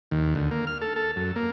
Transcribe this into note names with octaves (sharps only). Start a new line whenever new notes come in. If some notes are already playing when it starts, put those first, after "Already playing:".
D#2
D2
A#3
F6
A4
A4
F#2
A#3